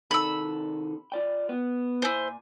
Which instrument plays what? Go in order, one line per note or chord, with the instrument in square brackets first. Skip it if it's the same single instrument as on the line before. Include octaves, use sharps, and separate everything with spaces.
[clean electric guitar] C3 D#3 A4 [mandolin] B5 E6
[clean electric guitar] F4 D5 G5
B3
[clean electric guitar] A#2 G#5 [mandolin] E4 C5